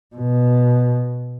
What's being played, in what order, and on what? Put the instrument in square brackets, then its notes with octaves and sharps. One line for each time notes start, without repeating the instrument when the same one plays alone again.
[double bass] B2